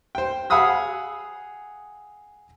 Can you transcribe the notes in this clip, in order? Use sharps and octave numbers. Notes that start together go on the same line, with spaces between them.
C5 G5
G#4 F5 F#5 B5 D#6 E6